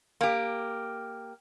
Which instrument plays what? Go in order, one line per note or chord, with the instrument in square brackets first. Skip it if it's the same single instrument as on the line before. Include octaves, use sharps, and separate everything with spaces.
[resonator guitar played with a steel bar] A#3 G4